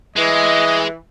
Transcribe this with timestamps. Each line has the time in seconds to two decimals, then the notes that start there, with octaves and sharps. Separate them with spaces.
0.16 E3 G#3 D#5